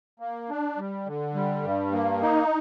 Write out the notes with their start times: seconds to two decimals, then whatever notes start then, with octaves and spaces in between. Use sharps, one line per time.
0.20 A#3
0.49 D4
0.77 G3
1.06 D3
1.34 G3
1.63 G2
1.92 A#3
2.21 D#4